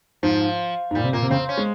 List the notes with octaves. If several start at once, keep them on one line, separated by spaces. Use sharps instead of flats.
G#2 F3
G#2
A#2 G3
C3
A#2 A#3
C3
C#3 C4
C#4
G#3